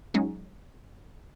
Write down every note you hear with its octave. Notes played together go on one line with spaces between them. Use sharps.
F#3 G#3 C#4 D#4